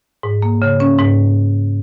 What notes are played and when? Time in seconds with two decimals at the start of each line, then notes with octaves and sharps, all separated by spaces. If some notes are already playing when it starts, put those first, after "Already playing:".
0.23 G#2
0.42 A#3
0.62 C#3
0.80 C#4
0.98 G#2